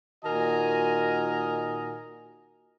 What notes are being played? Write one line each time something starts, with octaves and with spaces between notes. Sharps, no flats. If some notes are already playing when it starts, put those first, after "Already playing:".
A#2 D#3 F#4 A#4 D#5 G#5